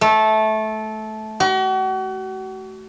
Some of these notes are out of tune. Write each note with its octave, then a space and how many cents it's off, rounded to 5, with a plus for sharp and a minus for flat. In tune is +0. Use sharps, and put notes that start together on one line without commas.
A3 -15
F#4 +40